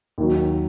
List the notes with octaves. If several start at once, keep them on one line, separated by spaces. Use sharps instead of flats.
D#2 D#3 F#3